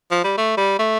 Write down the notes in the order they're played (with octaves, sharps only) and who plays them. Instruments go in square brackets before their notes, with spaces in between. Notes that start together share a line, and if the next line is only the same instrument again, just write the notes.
[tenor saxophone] F3
G3
A3
G3
A3